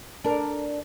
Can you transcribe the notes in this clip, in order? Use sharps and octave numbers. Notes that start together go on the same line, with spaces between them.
D4 A#4